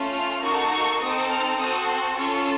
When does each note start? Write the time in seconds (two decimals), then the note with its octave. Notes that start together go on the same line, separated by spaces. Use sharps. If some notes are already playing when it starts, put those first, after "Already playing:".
Already playing: A3 C#4 F4
0.14 F6
0.42 A#3 D#4 F#4 A4 C#6
0.72 C#6
1.00 C4 D#4 A4 D#6
1.29 F6
1.58 C4 F#4 A4 D#6
1.87 C6
2.16 C#4 F4 A4 C#6